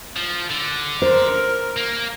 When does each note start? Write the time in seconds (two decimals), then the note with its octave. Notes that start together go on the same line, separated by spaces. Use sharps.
0.16 F3
0.50 D3
1.02 A#4 C5
1.76 A#3